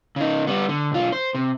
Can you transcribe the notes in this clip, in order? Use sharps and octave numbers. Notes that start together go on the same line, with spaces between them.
C#3 D#4
G3 B3
D3
B1 F4
C5
C3